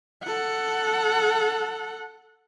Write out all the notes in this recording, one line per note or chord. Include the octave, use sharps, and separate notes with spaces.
A4 F#5